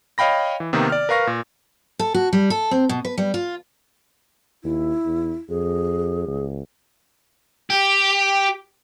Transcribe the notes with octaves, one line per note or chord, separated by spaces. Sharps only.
C#5 D#5 F5 G5 B5 A#6
E3
C3 D#3 A#3 B3 D#4
D5 F6
A#4 B4 F5 C#6 A#6
A#2
A4
F#4
G3
A4
C4
B2
B4
G3
F4
D#2 E4
E2
F2 G#4
C#2
G4